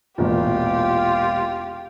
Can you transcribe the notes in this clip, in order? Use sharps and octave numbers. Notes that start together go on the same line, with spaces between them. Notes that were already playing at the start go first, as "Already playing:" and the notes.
E1 A1 A#2 F4 G4